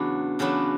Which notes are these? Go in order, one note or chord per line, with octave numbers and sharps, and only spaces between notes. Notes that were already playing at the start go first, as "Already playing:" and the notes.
Already playing: E2 C#3 F#3 B3 D4
E2 C#3 F#3 B3 D4